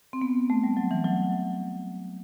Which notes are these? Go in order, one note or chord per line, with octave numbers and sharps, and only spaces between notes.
C4
B3
A3
G3
F#3
E3
F#3